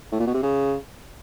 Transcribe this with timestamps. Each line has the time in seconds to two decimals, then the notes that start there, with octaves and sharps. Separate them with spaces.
0.12 A2
0.20 A#2
0.27 B2
0.34 C3
0.43 C#3